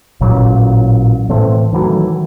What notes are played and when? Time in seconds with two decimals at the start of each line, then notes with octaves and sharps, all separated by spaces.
0.21 A1 A#2 F#3
1.29 A2 E3 A3 C4
1.72 D#3 E3 F#3 A3